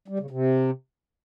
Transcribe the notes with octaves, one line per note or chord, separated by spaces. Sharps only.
G3
C#3
C3